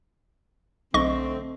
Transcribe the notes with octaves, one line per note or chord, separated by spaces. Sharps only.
B1 D3 A3 C4 D#5 C#6